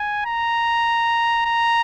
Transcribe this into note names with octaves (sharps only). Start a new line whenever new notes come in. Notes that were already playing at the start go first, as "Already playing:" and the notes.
Already playing: G#5
A#5
A#5